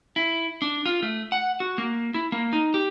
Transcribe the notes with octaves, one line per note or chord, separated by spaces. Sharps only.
E4
D4
F4
A3
F#5
F#4
A#3
E4
A#3
D#4
G4